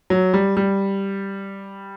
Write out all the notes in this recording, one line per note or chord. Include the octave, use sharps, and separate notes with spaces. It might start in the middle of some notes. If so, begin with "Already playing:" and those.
F#3
G3
G3